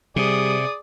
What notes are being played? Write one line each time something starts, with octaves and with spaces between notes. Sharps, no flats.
C3 G3 G#4 D5 D#6